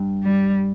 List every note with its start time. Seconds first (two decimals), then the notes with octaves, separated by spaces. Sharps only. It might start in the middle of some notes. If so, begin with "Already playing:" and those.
Already playing: G2
0.23 G3